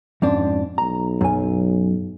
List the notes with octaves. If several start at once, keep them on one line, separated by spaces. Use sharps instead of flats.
F2 G#2 C#4 D4
B1 A#5
F#2 G#5